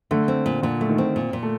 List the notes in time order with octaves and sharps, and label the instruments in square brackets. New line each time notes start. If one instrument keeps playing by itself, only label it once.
[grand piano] D3 [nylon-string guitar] A3
[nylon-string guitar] C4
A#2
[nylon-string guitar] A#2 [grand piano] D3
[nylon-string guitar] A3
[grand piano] D#3
[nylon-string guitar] C4
A#2
A#2
[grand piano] A3